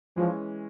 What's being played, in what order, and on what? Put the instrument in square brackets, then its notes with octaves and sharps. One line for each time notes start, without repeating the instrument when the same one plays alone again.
[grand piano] E3 G#3 C#4 [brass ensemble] F3